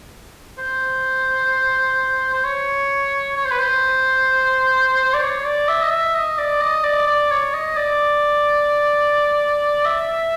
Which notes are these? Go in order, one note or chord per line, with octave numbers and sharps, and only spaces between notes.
C5
C5
C#5
C#5
C5
B4
C5
D5
C#5
D5
E5
D#5
E5
D#5
D5
D#5
D5
D5
C#5
D#5
D5
E5